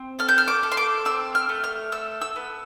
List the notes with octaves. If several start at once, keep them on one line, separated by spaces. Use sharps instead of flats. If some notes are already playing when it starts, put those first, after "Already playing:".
Already playing: C4
A4 F6
G6
F6
D6
A4
C6
D6
C4 E6
F6
A3
F6
A4 E6
E6
B3